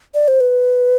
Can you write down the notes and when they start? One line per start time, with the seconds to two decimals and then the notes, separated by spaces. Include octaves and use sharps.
0.14 D5
0.28 C5
0.41 B4